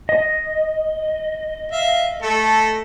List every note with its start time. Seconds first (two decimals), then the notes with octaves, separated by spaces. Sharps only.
0.09 D#5
1.72 E5 F5
2.22 A3 A4